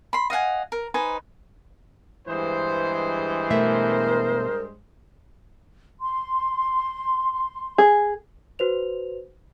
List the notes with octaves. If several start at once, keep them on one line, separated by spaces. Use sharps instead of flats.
B5 C6
D#5 F5 F#5 G#5
A#4
D#4 B4 C5 G#5
G2 E3 G#3 C5
B2 A3 A#4 E5
C6
G#4
F#4 B4 C5 F7